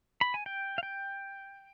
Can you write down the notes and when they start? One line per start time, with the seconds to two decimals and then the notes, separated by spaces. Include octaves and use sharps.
0.21 B5
0.34 G#5
0.46 G5
0.78 F5
0.83 G5